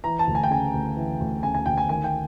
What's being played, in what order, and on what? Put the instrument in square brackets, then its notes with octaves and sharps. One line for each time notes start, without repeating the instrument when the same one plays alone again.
[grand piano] E3 A#5
A5
D2
G#5
G5
C#3 G#5
D2
E3
D2
C#3 G#5
G#5
D2 G5
G#5
D#3 G#5
G5